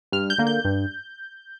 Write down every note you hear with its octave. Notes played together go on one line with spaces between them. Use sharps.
G2 F6
G6
D3 A#3
G6
G2